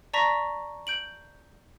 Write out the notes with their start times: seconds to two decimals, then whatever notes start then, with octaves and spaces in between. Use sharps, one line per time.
0.14 D5 A5 A#5 C#6 A#6 B6
0.87 G6 D7 F#7